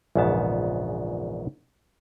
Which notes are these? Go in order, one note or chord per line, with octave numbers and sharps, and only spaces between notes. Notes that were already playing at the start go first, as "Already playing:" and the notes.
A#1 E2 G#2 C#3 B3 A5